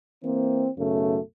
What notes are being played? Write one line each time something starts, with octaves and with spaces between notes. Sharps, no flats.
E3 A#3 C4
B1 F#2 C#3 A3